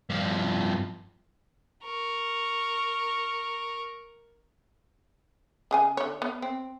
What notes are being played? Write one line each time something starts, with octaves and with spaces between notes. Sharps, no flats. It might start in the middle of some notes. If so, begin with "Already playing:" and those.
G2 F3
A#4 C#6
C#3 G#4 G#5
D3 C#5
B3 C#5
C4